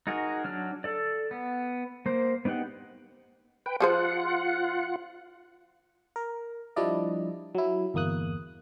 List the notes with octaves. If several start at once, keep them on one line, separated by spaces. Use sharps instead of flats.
D#4 F#4 G#4 A#4
F#3 D4 F6
A4 D5
B3
A#3 C5
B3 D4 D#4 G4 F#5
B4 G5
F3 F4 G#4 C5 F#5
A#4
F3 G3 D4 E4 D5 D#5
F#3 E4
G1 E2 A#3 D#6 F#6